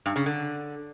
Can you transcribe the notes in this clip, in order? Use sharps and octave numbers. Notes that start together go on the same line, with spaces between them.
G2
C#3
D3